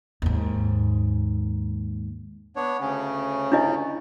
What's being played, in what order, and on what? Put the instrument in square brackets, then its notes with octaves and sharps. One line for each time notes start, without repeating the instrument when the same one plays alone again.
[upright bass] D#2 G#2
[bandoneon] B3 D4 C#5
D2 C#3 C#4
[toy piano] D4 E4 D#5